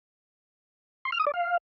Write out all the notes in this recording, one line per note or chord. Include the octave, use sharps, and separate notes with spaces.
C6
F6
D#6
D5
F5